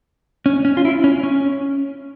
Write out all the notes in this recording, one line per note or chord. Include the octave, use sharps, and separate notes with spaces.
C#4
C#4
F4
E4
C#4
C#4